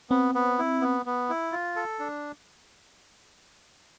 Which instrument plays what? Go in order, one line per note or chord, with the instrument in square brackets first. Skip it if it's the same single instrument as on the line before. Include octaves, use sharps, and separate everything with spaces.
[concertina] B3 [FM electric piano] C4
[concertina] B3
E4
B3
B3
E4
F4
A4
D4